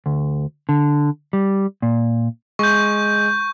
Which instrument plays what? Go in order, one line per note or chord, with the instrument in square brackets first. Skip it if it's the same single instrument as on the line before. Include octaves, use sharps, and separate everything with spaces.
[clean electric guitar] D2
D3
G3
A#2
[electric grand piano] G#3 [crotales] C#6 G6